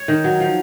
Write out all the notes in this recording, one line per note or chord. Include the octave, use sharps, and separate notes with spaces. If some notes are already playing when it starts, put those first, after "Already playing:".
Already playing: C#5
D#3
F#3
F3